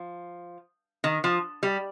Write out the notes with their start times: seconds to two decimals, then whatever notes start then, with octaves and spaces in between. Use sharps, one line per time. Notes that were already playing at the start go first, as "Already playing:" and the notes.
Already playing: F3
1.04 D#3
1.24 F3
1.63 G3